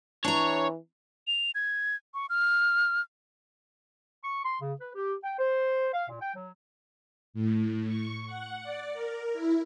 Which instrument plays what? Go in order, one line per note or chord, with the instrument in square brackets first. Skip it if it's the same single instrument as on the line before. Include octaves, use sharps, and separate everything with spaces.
[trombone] E3 [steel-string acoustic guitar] D4 A#5 [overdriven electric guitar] C#5
[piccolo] F7
G#6
C#6
F6
[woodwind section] C#6
C6
C#3
B4
G4
G5
C5
F5
A#2
G5
F#3
[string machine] A2
C#6
F#5
D5
A#4
E4